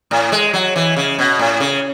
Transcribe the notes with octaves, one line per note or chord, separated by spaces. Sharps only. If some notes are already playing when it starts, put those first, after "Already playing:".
A2
G#3
F#3
E3
C#3
B2
A2
C#3